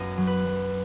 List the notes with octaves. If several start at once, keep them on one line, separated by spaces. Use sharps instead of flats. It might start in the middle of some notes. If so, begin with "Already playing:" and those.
Already playing: F#2 B3 D#5
F#3
B4
F#3